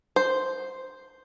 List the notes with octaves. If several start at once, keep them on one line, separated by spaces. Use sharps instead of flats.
C5